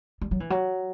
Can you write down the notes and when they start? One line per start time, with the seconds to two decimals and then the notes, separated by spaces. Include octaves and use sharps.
0.22 G3
0.31 F#3
0.40 E3
0.50 F#3